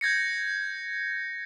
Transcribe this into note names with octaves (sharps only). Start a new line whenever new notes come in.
G6 G#6 A#6 C#7